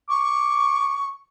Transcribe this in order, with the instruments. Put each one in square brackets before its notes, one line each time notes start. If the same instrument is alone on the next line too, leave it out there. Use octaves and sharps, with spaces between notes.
[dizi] C#6 [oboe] D6